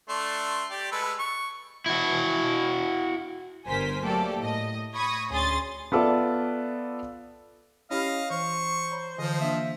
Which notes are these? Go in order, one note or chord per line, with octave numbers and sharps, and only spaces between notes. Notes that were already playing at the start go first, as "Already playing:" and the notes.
A3 D4 C6
G4 D5
G#3 A4 B4
C#6
E4 F#4
G1 G2 A#4 C5 G#5 B6
F#3 A3 A#3 G4 A4 D5
A2 D#5
B5 C#6 D#6 G#6 A#6
D2 C#4 G#4 C6 D#6 A6
B3 F4 A4 D5 E5
C#4 E4 G4 D#5 F5 B5
E3 C5 C#6
C#5 A#5 B5
D3 E3 F3 D#5
A#3 D4 E5